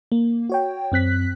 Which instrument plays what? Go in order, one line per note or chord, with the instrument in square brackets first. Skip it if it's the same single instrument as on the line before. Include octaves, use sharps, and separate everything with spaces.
[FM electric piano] A#3
F#4 C#5 G5
F#2 C4 F#6 B6